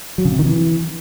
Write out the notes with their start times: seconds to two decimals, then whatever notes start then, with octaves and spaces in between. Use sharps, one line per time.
0.18 F#3
0.25 C#3
0.32 C3
0.39 D#3
0.46 E3